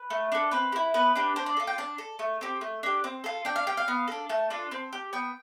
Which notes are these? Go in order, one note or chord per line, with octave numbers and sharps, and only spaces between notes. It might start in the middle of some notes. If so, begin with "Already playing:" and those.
Already playing: B4
A3
D4 A4
C4 B4
G4
E4
B3 B4
D4 G4
D4 C5
D5
F4 A4
G5
D4 A5
A4
A3
C4 G4
A3
D4 G4
C4
F4 A4
D4 G5
F5
G4 G5
F5
B3
D4 A4
A3 A5
D4 F4 A4
C4
G4
B3 G5